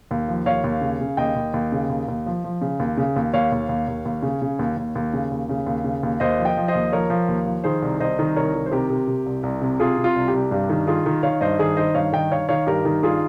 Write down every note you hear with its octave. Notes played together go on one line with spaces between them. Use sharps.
D#2
F3
D#2 C#5 F5
D#2
C#3
C#3
D#2 D#5 G5
D#2
D#2
C#3
D#2
D#2
F3
F3
C#3
D#2
C#3
D#2
D#2 C#5 F5
D#2
D#2
D#2
D#2
C#3
C#3
D#2
D#2
D#2
C#3
D#2
C#3
D#2
C#3
D#2
D#2 C5 D#5
F3
D#5 G5
F3
C5 D#5
D#2
F3 A#4 C#5
F3
D#2
F3
D#3 G#4 C5
C2
C2 C5 D#5
D#3
C2 A#4 C#5
D#3
C5
C3 G4 A#4
C3
C3
C2
C2
C3
C3 F4 G#4
C3
F4
C2
G4
C2
G2 G4
D#3
D#3 F4 G#4
D#3
D#3 C#5 F5
G2 C5 D#5
D#3 G#4 C5
D#3 C5 D#5
G2 C#5 F5
D#3 D#5 G5
D#3 C#5 F5
D#3 C#5 F5
G2 G4 A#4
D#3
G2 F4 G#4